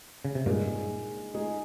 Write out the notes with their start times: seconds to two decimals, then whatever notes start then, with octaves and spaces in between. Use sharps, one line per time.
0.25 C#3
0.35 C3
0.46 G2 A#2 G#3 D#4 G#4
1.34 G#3 D#4 G#4